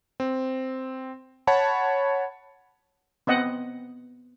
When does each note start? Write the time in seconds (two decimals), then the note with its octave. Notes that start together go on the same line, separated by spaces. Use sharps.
0.20 C4
1.47 C#5 F#5 A5 B5
3.27 B3 C4 D#5 F#5